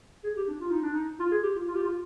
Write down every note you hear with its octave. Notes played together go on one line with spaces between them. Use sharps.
G#4
G4
D4
F4
D#4
D4
D#4
F4
G#4
G4
F4
F4
G4
F4